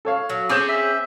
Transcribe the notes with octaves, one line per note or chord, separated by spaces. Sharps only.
A4 C#5 F5
F#3
C4 C#4 G#4 D6 G6 E7
E5